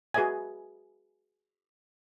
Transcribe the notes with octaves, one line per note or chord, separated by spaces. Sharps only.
F#4 G#4 B4 D#5 E5 G#5